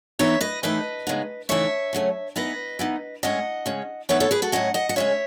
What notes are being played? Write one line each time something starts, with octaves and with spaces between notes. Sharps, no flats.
E3 B3 D#4 C#5 E5
B4 D#5
A2 E3 A3 D#4 B4 D#5
C#3 G#3 B3 D#4
C#3 E3 A3 D#4 C#5 E5
C#3 F#3 A3 C#4
E3 B3 D#4 B4 D#5
E3 B3 D#4
A2 G#3 C#4 D#5 F#5
C#3 G#3 C#4
E3 B3 D#4 C#5 E5
A4 C#5
G#4 B4
F#4 A4
A2 F#3 C#4 D#5 F#5
D#5 F#5
F#5
C#3 G#3 C#4 C#5 E5